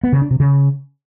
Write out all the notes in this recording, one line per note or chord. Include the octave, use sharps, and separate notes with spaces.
B3
C#3
D4
C3
C#3